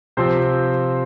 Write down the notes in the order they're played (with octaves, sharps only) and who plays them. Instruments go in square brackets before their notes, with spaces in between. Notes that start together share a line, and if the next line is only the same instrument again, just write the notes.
[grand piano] C3 F3 C4 C5